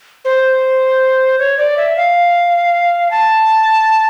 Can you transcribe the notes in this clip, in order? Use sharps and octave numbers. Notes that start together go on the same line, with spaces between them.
C5
C#5
D5
E5
F5
A5